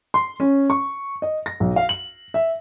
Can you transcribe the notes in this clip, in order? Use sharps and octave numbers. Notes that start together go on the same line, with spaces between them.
C6
C#4
C#6
D#5
A#6
B1
F5
F#7
E5